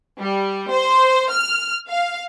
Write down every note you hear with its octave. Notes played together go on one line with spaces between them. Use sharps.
G3
C5
F6
F5